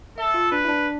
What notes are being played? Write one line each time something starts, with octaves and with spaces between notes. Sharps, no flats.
A4 E5
F4
D4 B4
E4
D4